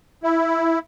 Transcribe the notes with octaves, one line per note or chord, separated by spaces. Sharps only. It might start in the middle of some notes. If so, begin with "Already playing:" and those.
E4